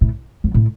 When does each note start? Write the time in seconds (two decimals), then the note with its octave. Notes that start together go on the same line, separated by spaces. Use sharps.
0.01 A2
0.44 F2
0.54 A2